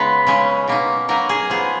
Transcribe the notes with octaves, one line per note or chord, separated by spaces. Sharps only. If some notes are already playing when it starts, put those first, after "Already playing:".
Already playing: C#3 G#3 B3 D#4 B4
C#3 G#3 C#4
B2 A#3 D#4
B2 F#3 A#3 D#4 A#4
G#4
F3 B3 D#4 G#4